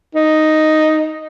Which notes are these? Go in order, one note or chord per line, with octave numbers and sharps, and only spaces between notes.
D#4